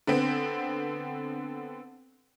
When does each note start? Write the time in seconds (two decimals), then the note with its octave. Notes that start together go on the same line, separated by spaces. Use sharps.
0.07 D3 B3 C4